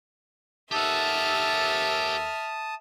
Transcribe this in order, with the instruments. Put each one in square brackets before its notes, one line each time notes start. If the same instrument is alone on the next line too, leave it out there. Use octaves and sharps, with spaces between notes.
[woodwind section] D#2 A4 [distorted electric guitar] G4 F#5 [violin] E5 F6 [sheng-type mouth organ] A5 D#6